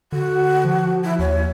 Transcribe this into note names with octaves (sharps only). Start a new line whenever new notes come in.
D3 F#4
F3
E4
D#2 C#5